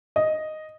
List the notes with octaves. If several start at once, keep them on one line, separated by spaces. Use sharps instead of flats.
D#5